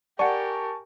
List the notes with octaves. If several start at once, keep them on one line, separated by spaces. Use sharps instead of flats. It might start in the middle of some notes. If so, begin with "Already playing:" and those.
G4 A#4 D5 F#5 G#5 A5 C#6